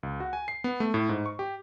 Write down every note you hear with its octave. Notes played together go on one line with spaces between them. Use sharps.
C#2
F#4
G#5
C7
B3
A3
A2
G#2
C#6
G4